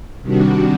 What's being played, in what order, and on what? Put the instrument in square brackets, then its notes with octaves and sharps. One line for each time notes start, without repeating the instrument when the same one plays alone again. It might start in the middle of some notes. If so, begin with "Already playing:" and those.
[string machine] C3 D#3 G3 D4 F#4